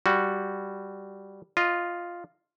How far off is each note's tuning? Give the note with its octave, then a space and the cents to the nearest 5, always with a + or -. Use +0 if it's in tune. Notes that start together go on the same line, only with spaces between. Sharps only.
G3 +0 F#4 +0
F4 +0 D#5 -10